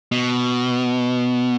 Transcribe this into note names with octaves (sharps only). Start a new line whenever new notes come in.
B2